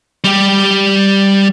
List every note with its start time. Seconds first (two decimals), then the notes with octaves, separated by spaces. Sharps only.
0.24 G3 G4